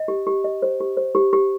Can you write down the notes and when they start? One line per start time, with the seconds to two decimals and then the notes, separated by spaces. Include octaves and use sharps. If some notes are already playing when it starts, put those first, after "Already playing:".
Already playing: D#5
0.08 G4
0.27 G4
0.44 D#5
0.62 C5
0.80 G4
0.97 C5
1.15 G4
1.33 G4